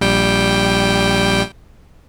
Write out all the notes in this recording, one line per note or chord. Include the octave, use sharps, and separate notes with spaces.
A#1 G3 G5